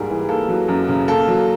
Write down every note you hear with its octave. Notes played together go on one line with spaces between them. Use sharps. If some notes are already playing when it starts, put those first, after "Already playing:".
Already playing: G#2 G3 A#3 G#4 A#4
E3
A#3 A4
F#3
F#2
C#3
A#3 A4
F#3